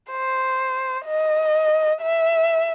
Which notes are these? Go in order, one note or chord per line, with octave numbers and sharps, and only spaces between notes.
C5
D#5
E5